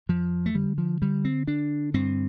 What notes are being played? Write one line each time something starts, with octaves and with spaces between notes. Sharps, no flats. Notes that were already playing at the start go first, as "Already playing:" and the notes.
F2 F3
A3
D3 G3
F3
D3 G3
C4
D3 D4
G2 C4